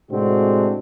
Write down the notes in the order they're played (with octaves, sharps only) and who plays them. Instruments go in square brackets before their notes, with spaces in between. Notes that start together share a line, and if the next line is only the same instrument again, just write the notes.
[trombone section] A2 C3 G#3 C4 D4 F#4